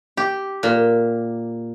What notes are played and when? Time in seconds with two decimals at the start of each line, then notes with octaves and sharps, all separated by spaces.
0.17 G4
0.63 A#2